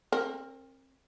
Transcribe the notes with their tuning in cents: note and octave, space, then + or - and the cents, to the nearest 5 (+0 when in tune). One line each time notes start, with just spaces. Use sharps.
C4 +35 A#4 -10